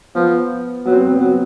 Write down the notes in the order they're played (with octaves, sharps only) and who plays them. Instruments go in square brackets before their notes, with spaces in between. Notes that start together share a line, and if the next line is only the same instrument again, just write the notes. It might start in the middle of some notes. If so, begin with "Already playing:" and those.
[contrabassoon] F3 [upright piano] B3
[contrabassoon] F#3 [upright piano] B3
[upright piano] C4
B3
C4
B3
[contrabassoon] F#3